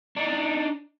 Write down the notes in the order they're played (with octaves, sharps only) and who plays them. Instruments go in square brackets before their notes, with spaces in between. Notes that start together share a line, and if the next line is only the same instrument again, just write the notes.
[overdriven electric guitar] D4 D#4